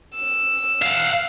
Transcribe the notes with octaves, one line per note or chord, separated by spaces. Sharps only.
E6
F5 F#5